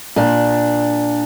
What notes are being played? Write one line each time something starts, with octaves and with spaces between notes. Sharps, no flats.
A#2 D4